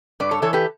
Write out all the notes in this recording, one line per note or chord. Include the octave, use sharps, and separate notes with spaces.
G2 B4 D5
A4 C#5
E3 A4 C#5
G4 B4